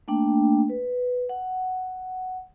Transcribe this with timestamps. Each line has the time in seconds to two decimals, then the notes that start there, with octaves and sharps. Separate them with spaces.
0.08 A3 A#3 D4 G5
0.69 B4
1.29 F#5